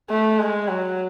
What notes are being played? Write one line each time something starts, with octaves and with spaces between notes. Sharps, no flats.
A3
G#3
F#3